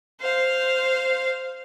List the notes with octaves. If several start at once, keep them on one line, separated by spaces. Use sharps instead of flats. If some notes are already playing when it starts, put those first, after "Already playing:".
C5 F5